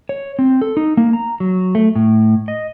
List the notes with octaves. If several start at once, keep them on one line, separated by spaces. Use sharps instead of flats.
C#5
C4
A4
D#4
A#3
A#5
F#3
A3
A2
D#5